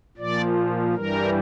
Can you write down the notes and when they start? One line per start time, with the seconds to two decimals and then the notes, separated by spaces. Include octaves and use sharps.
0.17 A#2 F3 D5
0.95 G2 E3 G3 A#4